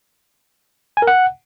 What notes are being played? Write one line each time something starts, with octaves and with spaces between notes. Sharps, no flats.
G#5
A#4
F#5